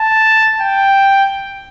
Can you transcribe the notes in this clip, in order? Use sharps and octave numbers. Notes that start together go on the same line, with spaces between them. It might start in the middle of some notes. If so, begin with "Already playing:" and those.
Already playing: A5
G5